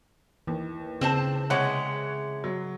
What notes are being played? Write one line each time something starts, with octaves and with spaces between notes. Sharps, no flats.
D#2 E3
C#3 C4 C5 A5
C3 G#3 C#5 F#5
F#3